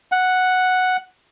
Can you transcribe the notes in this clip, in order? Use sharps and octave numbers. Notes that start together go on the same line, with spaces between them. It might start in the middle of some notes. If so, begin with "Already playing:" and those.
F#5